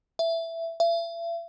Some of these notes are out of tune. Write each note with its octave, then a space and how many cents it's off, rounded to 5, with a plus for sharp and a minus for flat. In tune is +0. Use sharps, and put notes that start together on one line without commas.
E5 +10
E5 +40